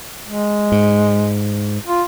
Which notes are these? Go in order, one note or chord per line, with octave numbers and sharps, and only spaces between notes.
G#3
G#2
F4